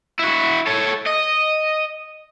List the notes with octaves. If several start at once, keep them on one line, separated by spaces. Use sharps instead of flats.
E4 F#4
A4 C#5
D#5